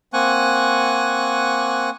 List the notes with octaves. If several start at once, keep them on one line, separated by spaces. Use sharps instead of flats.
A#3 C4 F#5 G#5 C#6 F#6